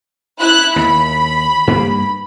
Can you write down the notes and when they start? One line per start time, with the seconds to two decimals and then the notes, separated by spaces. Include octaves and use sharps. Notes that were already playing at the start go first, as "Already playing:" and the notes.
0.38 E4 F#6
0.76 D#2 B5
1.67 G2 A#3